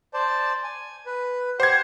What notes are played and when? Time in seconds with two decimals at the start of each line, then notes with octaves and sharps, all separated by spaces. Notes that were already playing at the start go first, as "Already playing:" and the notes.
0.14 C5 D5 A5
0.64 G#5
1.06 B4
1.60 G4 C5 F#5 G#6